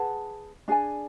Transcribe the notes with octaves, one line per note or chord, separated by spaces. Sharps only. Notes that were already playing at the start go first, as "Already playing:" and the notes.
Already playing: G#4 B4 F#5 A5
D4 G#4 D5 G#5